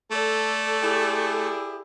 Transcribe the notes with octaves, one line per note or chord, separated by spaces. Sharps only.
A3 A4 D5
E4 G4 G#4